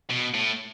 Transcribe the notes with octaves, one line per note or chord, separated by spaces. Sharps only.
B2
A2